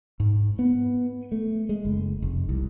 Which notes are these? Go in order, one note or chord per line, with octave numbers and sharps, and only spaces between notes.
G#2
B3
A3
G#3
F#1
F1
C2